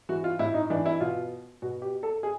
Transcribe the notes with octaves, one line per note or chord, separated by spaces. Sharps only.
E3 F#4
F4
A2 E4
D#4
E3 D4
E4
B2 F4
B2 F#4
G4
A4
G#4